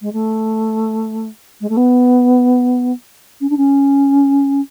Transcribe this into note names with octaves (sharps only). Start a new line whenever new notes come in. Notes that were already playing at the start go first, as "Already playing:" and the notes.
G#3
A3
G#3
A3
B3
C#4
D4
C#4